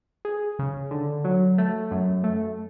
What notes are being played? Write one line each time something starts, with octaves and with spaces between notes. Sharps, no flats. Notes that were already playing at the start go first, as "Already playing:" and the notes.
G#4
C#3
D3
F#3
A3
F#2
A3